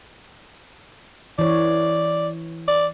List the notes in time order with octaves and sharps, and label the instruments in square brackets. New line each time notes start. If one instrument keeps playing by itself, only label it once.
[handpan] E3 C#5 [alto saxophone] D5
[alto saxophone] D5